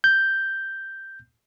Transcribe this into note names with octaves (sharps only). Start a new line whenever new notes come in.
G6